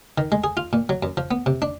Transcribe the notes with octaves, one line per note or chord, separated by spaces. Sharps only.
D#3
G#3
G#4
F4
A#2
F#3
F#2
F3
B3
C3
D4